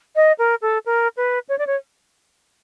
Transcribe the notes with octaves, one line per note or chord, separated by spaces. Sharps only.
D#5
A#4
A4
A#4
B4
C#5
D5
C#5